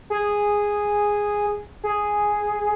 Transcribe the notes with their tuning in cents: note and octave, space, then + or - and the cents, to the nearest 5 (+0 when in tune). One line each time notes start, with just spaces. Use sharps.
G#4 -5
G#4 +0